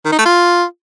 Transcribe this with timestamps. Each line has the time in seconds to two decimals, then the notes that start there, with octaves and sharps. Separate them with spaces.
0.05 D#3
0.12 D#4
0.19 A3
0.25 F4